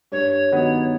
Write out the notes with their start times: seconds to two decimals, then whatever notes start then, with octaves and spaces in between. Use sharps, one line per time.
0.12 G2 C#5
0.52 D#3 F#3 B3 D#4